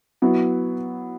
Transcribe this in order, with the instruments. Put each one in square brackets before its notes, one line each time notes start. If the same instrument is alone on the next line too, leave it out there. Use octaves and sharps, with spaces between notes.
[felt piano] F#3 B3 E4